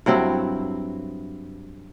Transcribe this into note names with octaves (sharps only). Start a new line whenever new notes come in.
G2 F#3 C4 E4